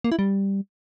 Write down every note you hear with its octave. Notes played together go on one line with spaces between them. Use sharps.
A#3
E4
G3